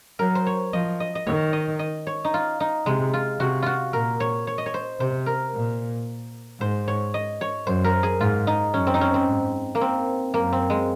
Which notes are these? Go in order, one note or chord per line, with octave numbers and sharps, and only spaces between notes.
F#3 A#4
C5
C#5
F3 D#5
D#5
D#5
D#3 C#5
D#5
D#5
C#5
D#4
F4
D#4
C3 G#3
F4
C3 F#4
F4 F#4
A#2 A#4
C#5
C#5
D#5
C#5
C5
C3 C5
A#4
A#2
G#2 C5
C#5
D#5
C#5
F#2 C5
A#4
G#4
G#2 F4
D#4
F#2 C#4
C4
D#4
C#4
C4
G#2
A#3
C4
F#2 A#3
C4
G#3